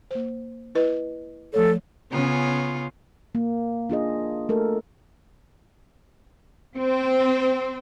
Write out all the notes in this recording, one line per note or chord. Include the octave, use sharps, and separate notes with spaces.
A#3 C5
E4 B4 D#5
F3 A3 A4 C#5
C#3 B3 C#4 F4
A#3
D4 F4 G#4 D#5
A3 A4 A#4
C4